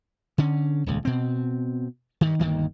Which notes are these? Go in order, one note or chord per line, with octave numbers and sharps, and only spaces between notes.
D3 C#4
D#1 C#2
B2 C4
G2 D#3
G1 D2 D#3 A#3